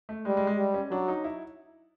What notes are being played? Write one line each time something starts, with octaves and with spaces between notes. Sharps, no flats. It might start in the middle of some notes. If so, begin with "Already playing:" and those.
A3
G3 G#3
G#3
G#3
G3
C#4
F#3 D4
D#4
E4